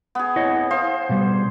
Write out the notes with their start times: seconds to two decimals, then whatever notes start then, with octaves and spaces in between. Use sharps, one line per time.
0.15 B3 G#4
0.36 E4 C#5 D#5
0.71 C5 F5
1.09 B2 G3